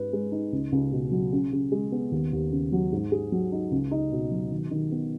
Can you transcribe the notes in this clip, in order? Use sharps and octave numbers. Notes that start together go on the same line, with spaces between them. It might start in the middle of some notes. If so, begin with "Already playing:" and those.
Already playing: G#2 B4
G#3
D#4
C#2
C#2
B2
F#3
C#3
C#3
G#3
B3
D#2
D#2
C#3
F#3
G#2
G#4
F#3
D#4
C#2
D#4
B2
F#3
D#3
D#3
B3